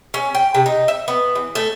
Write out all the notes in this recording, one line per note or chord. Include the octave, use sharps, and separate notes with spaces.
C#4
G5
C3
D#4
E5
B3
E3
A3